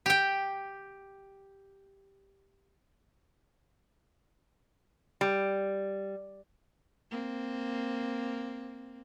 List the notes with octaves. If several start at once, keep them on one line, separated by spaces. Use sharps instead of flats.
G4 G5
G3
A#3 C4